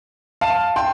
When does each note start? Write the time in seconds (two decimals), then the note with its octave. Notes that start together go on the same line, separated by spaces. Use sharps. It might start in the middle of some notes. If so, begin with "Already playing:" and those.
0.41 F5 A5
0.76 G5 C6